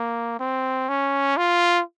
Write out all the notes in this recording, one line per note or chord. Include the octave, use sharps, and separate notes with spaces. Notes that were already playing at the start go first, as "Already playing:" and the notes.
Already playing: A#3
C4
C#4
F4